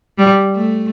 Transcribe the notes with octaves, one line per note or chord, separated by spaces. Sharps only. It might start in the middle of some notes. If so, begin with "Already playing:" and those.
G3
A3